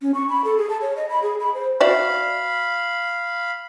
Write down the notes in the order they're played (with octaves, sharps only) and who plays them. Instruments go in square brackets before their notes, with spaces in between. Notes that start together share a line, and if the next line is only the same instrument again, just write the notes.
[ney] C#4
C#6
B5
A4
G#4
A5
C#5
D#5
B5
G#4
B5
C5
[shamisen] F#4 D5 E5 [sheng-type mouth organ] F5 B5